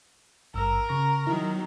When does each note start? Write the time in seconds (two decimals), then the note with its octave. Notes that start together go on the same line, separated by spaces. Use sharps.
0.54 G#1 G2 A#4 E6
0.89 C#3 C#6 A#6
1.27 D#3 F#3 E4